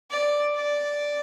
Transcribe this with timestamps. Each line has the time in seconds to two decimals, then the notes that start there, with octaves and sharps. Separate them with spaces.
0.11 D5
0.55 D5